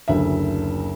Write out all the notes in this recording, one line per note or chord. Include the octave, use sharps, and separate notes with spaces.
F#1 D2 E5